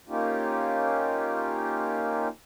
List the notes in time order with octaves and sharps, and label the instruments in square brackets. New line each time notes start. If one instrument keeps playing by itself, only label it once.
[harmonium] A#3 C#4 D#4 F4 G4